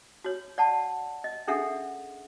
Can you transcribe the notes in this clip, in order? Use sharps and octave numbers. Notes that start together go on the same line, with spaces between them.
F#4 C#5
D5 F#5 A5
D#5
C#4 D4 G#4 A4 E5 F#5